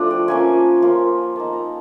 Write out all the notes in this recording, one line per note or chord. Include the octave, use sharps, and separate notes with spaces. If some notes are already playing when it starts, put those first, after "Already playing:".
Already playing: F3 A3 D4
G5
F3 A#3 C#4 G#5
F3 A#3 C#4 F4
A#3 D#4 A5
A#5